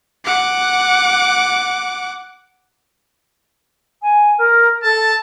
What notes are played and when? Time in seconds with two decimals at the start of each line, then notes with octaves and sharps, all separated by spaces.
0.25 F#5 D6
4.02 G#5
4.38 A#4
4.83 A4 A5